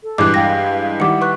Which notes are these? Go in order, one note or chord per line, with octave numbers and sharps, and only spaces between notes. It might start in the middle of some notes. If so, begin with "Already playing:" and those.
A4
G2 E3 G#3 D6 F#6
F5 G5 A#6
D#3 G3 E4 F#5 D6 C#7
B4 C#6 F#6